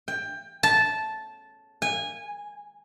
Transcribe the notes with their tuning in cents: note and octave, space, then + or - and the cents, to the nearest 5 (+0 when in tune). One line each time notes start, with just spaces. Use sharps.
G5 +20
A5 -10
G#5 -20